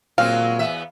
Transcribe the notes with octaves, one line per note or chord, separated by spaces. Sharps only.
A#2 F#3 G#3 C4 F5
E2 B3 E5